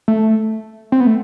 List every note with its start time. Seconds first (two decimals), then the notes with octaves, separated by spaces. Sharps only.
0.08 A3
0.92 C4
1.00 B3
1.07 A3